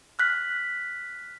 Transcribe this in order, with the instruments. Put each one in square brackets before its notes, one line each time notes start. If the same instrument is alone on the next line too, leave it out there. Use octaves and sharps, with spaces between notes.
[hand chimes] F6 F#6 B6